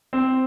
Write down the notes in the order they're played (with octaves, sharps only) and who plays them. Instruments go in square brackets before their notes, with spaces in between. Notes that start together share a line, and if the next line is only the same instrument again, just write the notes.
[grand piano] C4